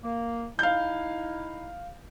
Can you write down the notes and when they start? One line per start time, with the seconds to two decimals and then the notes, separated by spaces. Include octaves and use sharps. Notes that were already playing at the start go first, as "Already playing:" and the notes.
0.03 A#3
0.59 D#4 E4 F5 G6